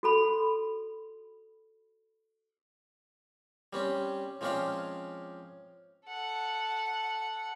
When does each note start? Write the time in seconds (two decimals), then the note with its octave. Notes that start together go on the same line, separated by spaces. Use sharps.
0.03 F#4 A4 B5
3.73 G3 C4 C#4
4.41 F3 G#3 C4 C#4 D5 F5
6.08 A4 F#5